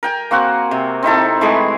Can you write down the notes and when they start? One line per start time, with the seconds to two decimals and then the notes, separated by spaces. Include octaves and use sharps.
0.03 A#4 G5 G#5
0.31 A#3 C4 F#4 F#5
0.71 C3
1.03 C4 D#4 E4 A4
1.41 E3 G#3 A3 G#4